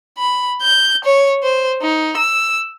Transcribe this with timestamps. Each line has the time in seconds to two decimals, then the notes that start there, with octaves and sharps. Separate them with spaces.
0.18 B5
0.62 G6
1.05 C#5
1.43 C5
1.82 D#4
2.17 E6